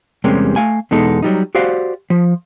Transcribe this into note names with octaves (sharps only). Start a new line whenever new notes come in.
E2 C3 G3 G#3 A#3 C#4
A3 F5 G#5
E2 B2 G#3 D#4 A4
F#3 G3 D#4
F#4 G4 C5 D5 F5
F3